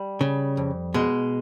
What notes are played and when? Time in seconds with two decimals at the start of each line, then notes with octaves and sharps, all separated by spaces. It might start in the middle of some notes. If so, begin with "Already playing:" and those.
Already playing: G3
0.21 C#3
0.57 F2
0.94 B2 G#3